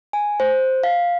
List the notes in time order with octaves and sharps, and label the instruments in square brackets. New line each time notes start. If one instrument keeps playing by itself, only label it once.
[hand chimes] G#5
C5
F5